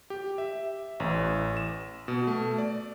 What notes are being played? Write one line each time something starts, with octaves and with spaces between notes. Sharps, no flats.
G4
E5
A1
E7
B2
A3
D5